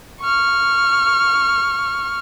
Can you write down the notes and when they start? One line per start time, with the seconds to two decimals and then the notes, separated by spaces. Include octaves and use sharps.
0.21 C#6 F6